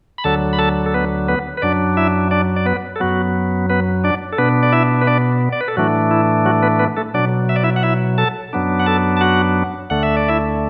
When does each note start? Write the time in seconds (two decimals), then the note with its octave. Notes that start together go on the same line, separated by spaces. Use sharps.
0.18 B5
0.24 D2 D3 F#3 A4 A5
0.53 B5
0.59 A4 A5
0.86 A4
0.94 B3 B4
1.28 B3 B4
1.57 B4
1.62 F#2 F#3 D4 D5
1.97 E4 E5
2.31 D4 D5
2.56 D5
2.66 B3 B4
2.96 A4
3.00 F#2 F#3 B3 F#4
3.70 B3 B4
4.04 D4 D5
4.33 A4
4.38 B2 B3 D4 B4
4.63 D5
4.72 E4 E5
5.01 B4
5.07 D4 D5
5.53 D5
5.61 B4
5.68 A4
5.77 A2 E3 F#3 A3 D4 F#4
6.11 E4
6.45 F#3 F#4
6.62 B3 B4
6.79 B3 B4
6.97 A3 A4
7.14 B2 F#3 D4 D5
7.49 E5
7.56 D5
7.64 E4 E5
7.76 F#5
7.83 E4 E5
8.18 A4 A5
8.53 F#2 F#3 B3 D4
8.80 F#5
8.86 A4 A5
9.17 A5
9.21 F#4 F#5
9.90 D2 D3 A3 F#5
10.03 E5
10.17 D5
10.28 E4 E5